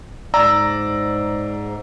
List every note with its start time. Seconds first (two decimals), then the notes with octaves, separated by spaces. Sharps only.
0.34 G#2 D5 A#5 E6